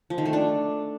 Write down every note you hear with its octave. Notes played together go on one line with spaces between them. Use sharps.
F3
D#3
A3
D4